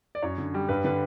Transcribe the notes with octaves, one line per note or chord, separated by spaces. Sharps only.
D5
F#2 C#5
D3
G3
G2 B4
D3 B4